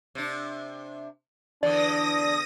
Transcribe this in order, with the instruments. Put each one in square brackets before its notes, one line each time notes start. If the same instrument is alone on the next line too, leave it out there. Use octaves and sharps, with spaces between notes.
[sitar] C3 D4
[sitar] E2 D3 [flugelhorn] D4 [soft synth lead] D5 [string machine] D#6 A#6